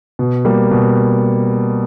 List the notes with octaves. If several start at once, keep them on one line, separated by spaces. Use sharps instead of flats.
B2
G3 A#3
B2